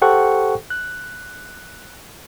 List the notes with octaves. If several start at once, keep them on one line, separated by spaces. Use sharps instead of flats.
G4 A4 C5 F#5 G5 C#6
F#6